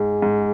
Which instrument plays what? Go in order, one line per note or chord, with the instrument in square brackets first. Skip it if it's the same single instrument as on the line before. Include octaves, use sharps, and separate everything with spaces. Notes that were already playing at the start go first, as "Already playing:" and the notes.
Already playing: [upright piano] G#2 [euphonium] G#4
[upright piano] G#2